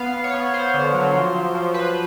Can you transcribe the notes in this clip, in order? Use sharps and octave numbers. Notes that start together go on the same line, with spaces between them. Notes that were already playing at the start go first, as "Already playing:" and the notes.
Already playing: B3 F5
B3
C#5
B3
B3 C5
D3
F#3
F3
F3
F3
F3 B4